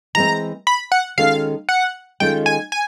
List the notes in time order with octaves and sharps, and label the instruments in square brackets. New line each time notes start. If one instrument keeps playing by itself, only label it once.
[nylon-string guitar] E3 G#3 C4 [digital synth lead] A#5
[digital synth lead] B5
F#5
[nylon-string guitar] D#3 G#3 C#4 F#4 A4 [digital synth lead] F5
[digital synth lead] F#5
[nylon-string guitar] D#3 G#3 C#4 F4 A4 [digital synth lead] G5
[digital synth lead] G#5
G#5